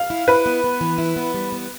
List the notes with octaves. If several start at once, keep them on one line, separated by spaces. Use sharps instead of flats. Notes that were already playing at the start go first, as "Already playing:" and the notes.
Already playing: F5
E4
E4 B4
B3
B3
E3
E4
B3
G3
B3